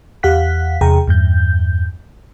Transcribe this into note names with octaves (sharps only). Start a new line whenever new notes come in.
E2 G4 F5 F#5 F#6 B6
E2 C3 G#4 G5 A#5
E2 G2 G6